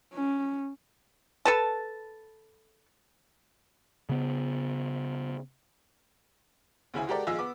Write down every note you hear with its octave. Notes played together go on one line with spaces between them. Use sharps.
C#4
A4 B4 A5
C#3 B3
D2 C#3 E4 G#5
G#3 F#4 G4 A4 A#4 D5
A#1 F4 G#4 D#5 G#5 E6
B3 D6